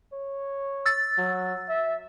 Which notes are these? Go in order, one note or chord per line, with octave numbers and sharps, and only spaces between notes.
C#5
E6 A6
F#3
E5